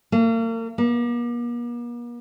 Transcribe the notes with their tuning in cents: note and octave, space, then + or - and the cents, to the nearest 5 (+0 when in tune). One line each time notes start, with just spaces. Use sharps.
A#3 -40
A#3 +45